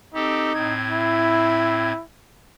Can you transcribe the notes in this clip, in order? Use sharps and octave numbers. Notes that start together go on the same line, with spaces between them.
C4 D#4 G4 A4
A2 C4 G#6
E4